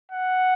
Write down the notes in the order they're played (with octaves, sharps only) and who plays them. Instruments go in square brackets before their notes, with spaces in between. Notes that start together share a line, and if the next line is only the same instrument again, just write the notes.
[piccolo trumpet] F#5